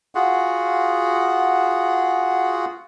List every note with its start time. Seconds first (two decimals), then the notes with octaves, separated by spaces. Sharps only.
0.15 F4 F#4 G#4 F#5